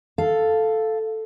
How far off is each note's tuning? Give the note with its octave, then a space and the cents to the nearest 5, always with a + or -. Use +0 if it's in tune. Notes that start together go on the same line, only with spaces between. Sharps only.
A4 +0 F5 +0